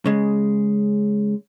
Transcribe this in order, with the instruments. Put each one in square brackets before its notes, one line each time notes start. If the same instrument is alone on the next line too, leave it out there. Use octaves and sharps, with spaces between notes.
[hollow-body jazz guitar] C#3 G#3